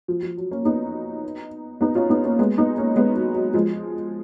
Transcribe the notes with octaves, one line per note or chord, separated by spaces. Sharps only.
F3
F3
F#3
A#3 C#4
B3 D#4
B3 D#4
C#4 F4
B3 D#4
A#3 C#4
G#3 B3
B3 D#4
A#3 C#4
G#3 B3
F#3
F#3
F3 G#3